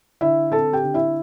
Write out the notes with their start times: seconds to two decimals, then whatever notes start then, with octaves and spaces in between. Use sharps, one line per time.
0.21 D3 E4 E5
0.52 C4 A4 A5
0.73 G4 G5
0.83 D3
0.94 E4 E5